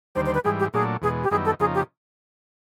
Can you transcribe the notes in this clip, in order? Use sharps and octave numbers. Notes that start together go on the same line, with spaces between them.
D#2 D3 G3 C5
C5
B4
G#2 E3 G3 G#4
G4
A#2 F#3 A3 D4 G#4
E2 B2 G#3 G#4
G4
F#2 D#3 G3 B3 E4 G#4
A4
F2 C#3 F3 A#3 D#4 G#4
G4